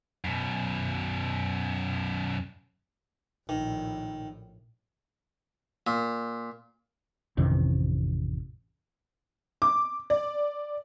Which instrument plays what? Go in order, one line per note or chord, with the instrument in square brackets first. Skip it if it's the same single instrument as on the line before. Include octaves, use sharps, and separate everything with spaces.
[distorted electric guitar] F#2 B2
[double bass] A#1 A2 [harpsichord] D#3
[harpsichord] A#2
[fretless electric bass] A1 F2 C3 D#3
[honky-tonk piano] D6
D5